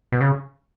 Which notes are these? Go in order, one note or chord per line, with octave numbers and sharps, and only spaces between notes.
B2
C#3